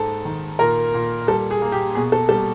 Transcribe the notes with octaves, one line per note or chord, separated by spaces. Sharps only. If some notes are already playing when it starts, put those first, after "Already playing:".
Already playing: G#2 A4
D#3
A#2 A#4
A#2
G3 A4
G#4
A#3
G4
B2 G#4
A4
G3 A4